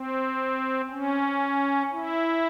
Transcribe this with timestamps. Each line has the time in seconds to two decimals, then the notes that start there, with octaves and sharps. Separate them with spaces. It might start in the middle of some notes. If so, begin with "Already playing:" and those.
Already playing: C4
0.91 C#4
1.93 E4